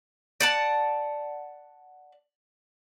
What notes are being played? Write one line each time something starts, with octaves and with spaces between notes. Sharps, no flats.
D5 F#5 A5